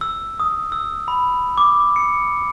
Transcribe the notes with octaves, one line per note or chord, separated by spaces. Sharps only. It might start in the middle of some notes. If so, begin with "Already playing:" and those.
E6
D#6
E6
B5
D6
C#7